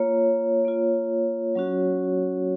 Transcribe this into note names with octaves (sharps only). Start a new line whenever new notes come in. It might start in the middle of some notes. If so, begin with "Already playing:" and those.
Already playing: A#3 F4 C#5
A#3 F4
F#3 C#4 F#4